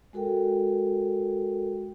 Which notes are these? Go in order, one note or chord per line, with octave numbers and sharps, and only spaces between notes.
G#3 F#4 A4 A#4 G5